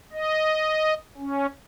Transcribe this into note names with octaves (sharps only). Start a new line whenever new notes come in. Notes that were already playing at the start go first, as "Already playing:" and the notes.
D#5
C#4